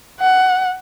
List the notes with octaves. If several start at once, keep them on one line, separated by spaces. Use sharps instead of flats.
F#5